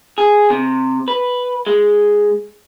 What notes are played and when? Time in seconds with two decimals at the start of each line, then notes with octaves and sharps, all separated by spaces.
0.18 G#4
0.50 C3
1.08 B4
1.67 G#3